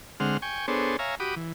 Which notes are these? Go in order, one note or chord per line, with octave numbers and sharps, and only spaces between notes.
D3 G#3 C4 F#5 F6
G5 G#5 C#6
B3 D4 G#4 A4 C5 C#5
C#5 E5 F5 G#5 A#5
F#4 G4 B5 D6 D#6
E3